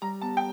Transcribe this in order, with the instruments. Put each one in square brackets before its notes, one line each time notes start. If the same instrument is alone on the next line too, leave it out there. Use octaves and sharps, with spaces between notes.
[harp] G3 [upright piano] A#5
[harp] B3 [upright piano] A5
[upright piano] G5